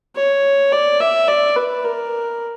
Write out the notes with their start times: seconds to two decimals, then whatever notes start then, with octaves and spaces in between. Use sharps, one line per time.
0.16 C#5
0.72 D5
1.00 E5
1.28 D5
1.56 B4
1.85 A#4